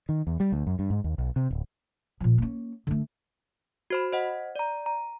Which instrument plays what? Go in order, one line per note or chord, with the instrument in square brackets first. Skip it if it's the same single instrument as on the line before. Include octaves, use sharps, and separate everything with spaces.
[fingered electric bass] D#3
E2
G3
D2
F#2
G2
G#2
D#2
B1
C3
D1
[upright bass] A#2 F3
A#3 C#4
D3 A3
[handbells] F#4 C5 B5
C5 D#5 F#5
D5 A#5
A#5